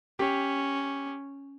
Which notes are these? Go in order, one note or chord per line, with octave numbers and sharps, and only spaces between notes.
C#4 G4